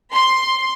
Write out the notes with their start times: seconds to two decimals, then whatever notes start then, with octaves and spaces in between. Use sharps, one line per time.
0.12 C6